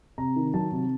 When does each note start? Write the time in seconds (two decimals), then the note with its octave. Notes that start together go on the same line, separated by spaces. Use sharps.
0.18 C3 A#5
0.36 D#3
0.54 F#3 A5
0.72 C3